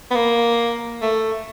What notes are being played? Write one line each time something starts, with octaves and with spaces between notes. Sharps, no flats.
B3
A#3
A3